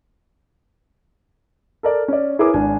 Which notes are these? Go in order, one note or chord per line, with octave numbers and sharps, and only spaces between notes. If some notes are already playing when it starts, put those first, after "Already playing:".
A4 A#4 D5
C#4 D5
E4 G#4 A#4 B4 C#5 D6
G#1 D4 G#5